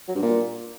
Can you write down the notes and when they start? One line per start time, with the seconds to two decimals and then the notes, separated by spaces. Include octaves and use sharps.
0.08 F#3
0.15 G2
0.22 A#2